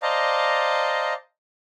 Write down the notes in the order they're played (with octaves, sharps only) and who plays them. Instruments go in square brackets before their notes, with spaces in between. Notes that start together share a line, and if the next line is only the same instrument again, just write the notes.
[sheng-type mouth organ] C5 D5 D#5 F5 A5 A#5